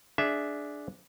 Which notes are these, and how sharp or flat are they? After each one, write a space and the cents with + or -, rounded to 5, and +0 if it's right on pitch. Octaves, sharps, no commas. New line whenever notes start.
D4 +0 G#4 +15 E5 +0